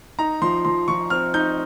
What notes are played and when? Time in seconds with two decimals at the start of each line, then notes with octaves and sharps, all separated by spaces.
0.19 D#4 A#5
0.42 F3 C6
0.65 F3 C6
0.88 F3 C#6
1.10 C4 F6
1.34 D#4 G6